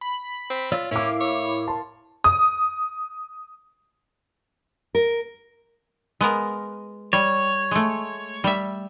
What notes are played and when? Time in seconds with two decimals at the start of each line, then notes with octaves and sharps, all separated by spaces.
0.01 B5
0.50 C4
0.72 F4 C#5 D5 E6
0.91 A2 C#4 E4 A#4 F5 D6
1.20 C#5
1.68 A5 C6
2.24 D#6
4.95 A#4
6.21 G#3 B3 A#4
7.13 G3 C#5
7.71 G#3 A3
8.44 G3 E5